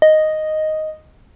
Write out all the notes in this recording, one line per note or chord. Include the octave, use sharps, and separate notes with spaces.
D#5